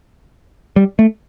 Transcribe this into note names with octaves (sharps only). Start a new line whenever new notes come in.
G3
A3